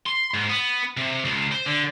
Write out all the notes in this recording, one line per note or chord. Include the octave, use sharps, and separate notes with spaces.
C6
G#2
B3
C3
C#2
C5
D3